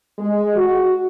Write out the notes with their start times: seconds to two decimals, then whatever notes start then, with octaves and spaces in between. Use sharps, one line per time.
0.19 G#3
0.56 F#4